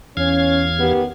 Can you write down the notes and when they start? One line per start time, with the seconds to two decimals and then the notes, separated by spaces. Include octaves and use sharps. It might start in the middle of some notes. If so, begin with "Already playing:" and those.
0.17 E2 C#4 F5 G#6
0.79 D#3 B3 G4